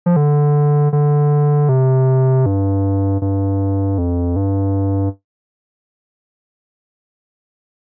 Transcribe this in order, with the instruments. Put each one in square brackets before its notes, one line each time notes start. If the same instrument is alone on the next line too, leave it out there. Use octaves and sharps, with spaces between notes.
[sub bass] F3
D3
D3
C3
G2
G2
F2
G2